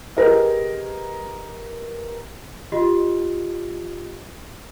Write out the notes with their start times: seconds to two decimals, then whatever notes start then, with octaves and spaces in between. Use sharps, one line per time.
0.17 G4 G#4 A#4 B4 D#5
2.72 F4 G4 D#5